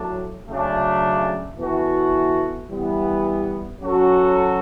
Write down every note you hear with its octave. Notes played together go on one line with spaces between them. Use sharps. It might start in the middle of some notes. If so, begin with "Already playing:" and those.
Already playing: A2 F#3 A3 D4
C#3 F#3 A3 D4
E3 B3 F#4 A4
E3 G3 B3
F#3 C#4 F#4 A4